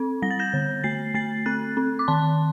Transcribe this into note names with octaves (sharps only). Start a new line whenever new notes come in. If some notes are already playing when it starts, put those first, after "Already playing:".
Already playing: C4
G3 A#6
A6
G6 A#6
D3
A3 A6 C7
A3 A6 C7
C4 F#6 A6
C4
D6
D#3 A5 C6